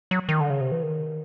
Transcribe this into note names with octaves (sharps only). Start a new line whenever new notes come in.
F#3
D#3
D3
C#3
C3
E3
D#3